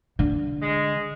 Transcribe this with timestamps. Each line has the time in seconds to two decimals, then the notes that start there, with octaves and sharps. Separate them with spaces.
0.19 D3
0.61 G#3